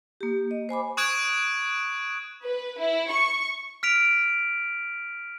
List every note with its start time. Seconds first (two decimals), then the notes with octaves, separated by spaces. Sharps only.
0.21 A#3 G4
0.51 D#5
0.69 C5 G#5 B5 D6
0.97 C#6 D#6 F#6 G#6 D7 E7
2.45 B4
2.80 E4
3.11 C#6
3.83 F6 B6 D7 F7